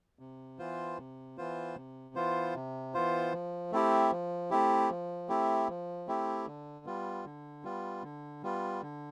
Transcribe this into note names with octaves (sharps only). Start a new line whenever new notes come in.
C3
E3 B3 F4 C5
C3
E3 B3 F4 C5
C3
E3 B3 F4 C5
C3
E3 B3 F4 C5
F3
A3 C4 E4 G4
F3
A3 C4 E4 G4
F3
A3 C4 E4 G4
F3
A3 C4 E4 G4
D3
G3 B3 F4
D3
G3 B3 F4
D3
G3 B3 F4
D3